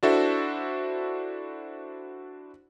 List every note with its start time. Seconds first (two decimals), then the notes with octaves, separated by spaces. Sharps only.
0.03 D4 E4 F#4 A4 C5 E5